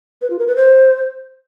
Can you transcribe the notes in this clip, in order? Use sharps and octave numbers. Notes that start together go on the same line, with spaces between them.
B4
F4
A#4
B4
C5